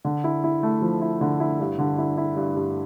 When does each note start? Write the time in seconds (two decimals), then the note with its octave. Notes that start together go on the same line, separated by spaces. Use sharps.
0.05 D3
0.24 E4
0.44 E4
0.63 A3
0.82 F3
1.01 E4
1.21 D3
1.40 E4
1.60 G2
1.78 D3
1.98 E4
2.17 E4
2.36 G2
2.56 G2